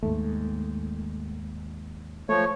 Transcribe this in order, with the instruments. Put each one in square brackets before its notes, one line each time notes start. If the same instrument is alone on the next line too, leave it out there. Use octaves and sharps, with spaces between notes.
[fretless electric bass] D#2 G#2 [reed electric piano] A3
[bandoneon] F3 C#5 [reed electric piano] A3